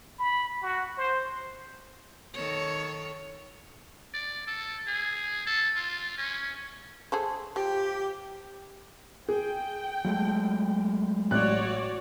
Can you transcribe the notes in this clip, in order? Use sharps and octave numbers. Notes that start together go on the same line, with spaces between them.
B5
F#4
C5
D#3 A4 C#5
D5
A4
G#4
A4
F4
C#4
G#4 A4 C5
F3 G4
G#4 G5
F#3 G#3 A3
A1 F#4 C#5 D5 F#6